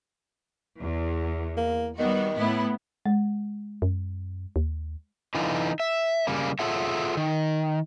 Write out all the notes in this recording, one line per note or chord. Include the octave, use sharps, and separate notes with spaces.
E2
A#3
D#3 G3 B3 F#4
A2 B3 E4
G#3
F#2
D#2
D3 E3 B3 D#4 F4
E5
C#3 G3 A#3
F4 G#4 A4 C#5 E5 F#5
D#3